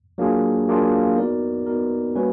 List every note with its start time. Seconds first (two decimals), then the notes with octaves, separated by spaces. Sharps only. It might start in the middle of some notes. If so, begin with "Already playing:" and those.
0.18 F#3 A#3 D4 F4 G#4
0.68 F#3 A#3 D4 F4 G#4
1.17 B3 D#4 F#4 A#4 D5
1.66 B3 D#4 F#4 A#4 D5
2.15 G3 A#3 C#4 F#4 B4